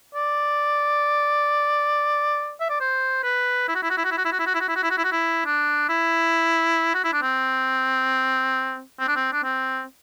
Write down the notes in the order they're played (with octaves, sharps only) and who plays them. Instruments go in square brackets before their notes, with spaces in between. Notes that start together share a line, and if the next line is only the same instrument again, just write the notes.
[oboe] D5
E5
D5
C5
B4
E4
F#4
E4
F#4
E4
F#4
E4
F#4
E4
F#4
E4
F#4
E4
F#4
E4
F#4
E4
F#4
E4
F#4
E4
D4
E4
F#4
E4
D4
C4
C4
D4
C4
D4
C4